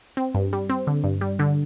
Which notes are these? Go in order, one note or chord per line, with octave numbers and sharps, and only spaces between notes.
C4
G2
G3
C4
D3
G2
G3
D3